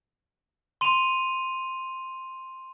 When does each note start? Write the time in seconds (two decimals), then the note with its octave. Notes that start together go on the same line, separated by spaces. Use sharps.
0.81 C6 D#7 F7